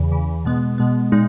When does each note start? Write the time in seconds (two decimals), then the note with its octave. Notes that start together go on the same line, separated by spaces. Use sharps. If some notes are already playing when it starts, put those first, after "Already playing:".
Already playing: E2 C#3 E3
0.12 E2 C#3 E3
0.45 B2 G#3 B3
0.78 B2 G#3 B3
1.12 A#2 G#3 D#4